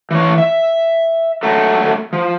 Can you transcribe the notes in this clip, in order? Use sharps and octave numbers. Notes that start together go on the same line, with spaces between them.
E3 C#5
E5
F#3 A3 A4
F3